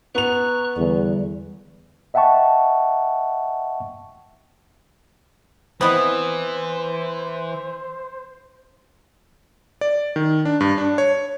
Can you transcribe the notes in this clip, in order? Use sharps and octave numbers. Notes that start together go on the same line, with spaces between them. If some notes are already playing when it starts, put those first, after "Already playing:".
B3 A#5 C#6 F#6 F7
E2 D3 G3
D#5 E5 F#5 G5 A5 C#6
E3 B3 C4 E4 C5 D#5
D5
D#3
D4
G2
D4
C#5